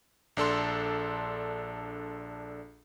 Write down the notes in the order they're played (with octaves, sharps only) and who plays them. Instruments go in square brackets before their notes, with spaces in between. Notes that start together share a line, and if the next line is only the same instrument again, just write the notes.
[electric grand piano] A#1 D4 A4 C6